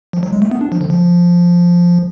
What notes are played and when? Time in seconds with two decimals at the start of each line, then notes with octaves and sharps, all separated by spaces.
0.13 F3
0.23 F#3
0.32 G#3
0.42 A3
0.51 B3
0.61 D4
0.72 F3
0.81 D3
0.90 F3